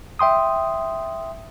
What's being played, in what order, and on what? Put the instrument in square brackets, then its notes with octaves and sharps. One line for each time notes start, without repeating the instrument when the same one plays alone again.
[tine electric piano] E5 G5 C6 D#6